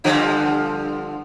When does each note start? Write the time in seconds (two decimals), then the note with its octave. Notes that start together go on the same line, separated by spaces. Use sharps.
0.04 G2 D3 F3